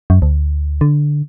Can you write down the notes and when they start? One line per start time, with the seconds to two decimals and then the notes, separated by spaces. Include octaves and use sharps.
0.10 F#2
0.22 D2
0.81 D3